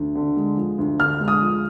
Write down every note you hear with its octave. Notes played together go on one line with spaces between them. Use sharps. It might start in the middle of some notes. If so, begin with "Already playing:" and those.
Already playing: D2
D3
G#3
F3
D2
D3 F6
G#3
D#6
F3